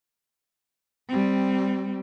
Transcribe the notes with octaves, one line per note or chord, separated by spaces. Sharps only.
G3 C4